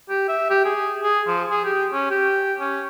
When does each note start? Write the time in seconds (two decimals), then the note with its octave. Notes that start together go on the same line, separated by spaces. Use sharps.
0.09 G4
0.28 E5
0.50 G4
0.65 G#4
1.03 G#4
1.27 F3
1.51 G#4
1.65 G4
1.92 C#4
2.11 G4
2.60 C#4